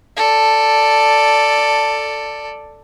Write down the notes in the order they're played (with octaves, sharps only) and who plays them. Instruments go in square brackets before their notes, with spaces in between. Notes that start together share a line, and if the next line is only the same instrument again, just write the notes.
[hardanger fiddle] A4 D5